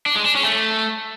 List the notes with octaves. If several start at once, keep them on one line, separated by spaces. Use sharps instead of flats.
D4
G#3
D4
C#4
A3